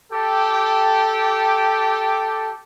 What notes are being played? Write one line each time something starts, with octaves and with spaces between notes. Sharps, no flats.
G4 A4